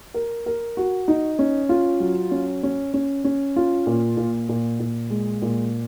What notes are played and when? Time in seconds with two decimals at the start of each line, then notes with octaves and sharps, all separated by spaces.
0.14 A#4
0.46 A#4
0.77 F#4
1.08 D#4
1.39 C#4
1.69 F4
2.00 F#3
2.31 C#4
2.63 C#4
2.94 C#4
3.24 C#4
3.56 F4
3.87 A#2
4.17 A#2
4.49 A#2
4.80 A#2
5.10 G#3
5.42 A#2